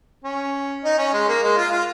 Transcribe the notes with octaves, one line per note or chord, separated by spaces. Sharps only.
C#4
D#4
C#4
G#3
A#3
G#3
F4
F4